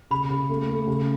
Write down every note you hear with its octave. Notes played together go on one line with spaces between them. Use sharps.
C#3 B5
C#3
A3
A3
C#3